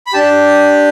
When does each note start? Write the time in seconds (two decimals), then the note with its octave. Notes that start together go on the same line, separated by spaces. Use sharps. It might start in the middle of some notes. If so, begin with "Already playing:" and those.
0.06 B5
0.13 D4 G4 A5